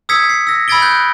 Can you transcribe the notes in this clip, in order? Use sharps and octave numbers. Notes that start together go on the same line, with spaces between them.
D#6 E6 G#6 B6 C#7
C7
E6 A#6
B5 E6 G#6 A6 D7 G7
F#6 G6